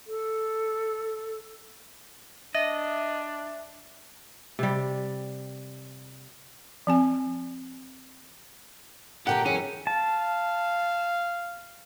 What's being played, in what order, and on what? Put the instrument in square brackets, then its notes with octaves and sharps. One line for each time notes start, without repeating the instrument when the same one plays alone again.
[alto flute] A4
[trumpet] D4 [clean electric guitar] D#5 [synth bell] E5
[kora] C3 G3
[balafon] F3 C4 G#5
[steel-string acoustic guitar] A#2 D3 A#5 [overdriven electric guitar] G4 [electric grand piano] F#5
[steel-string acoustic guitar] F#2 E3 G#4 [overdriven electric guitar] C#4
[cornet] F5 [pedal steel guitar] A5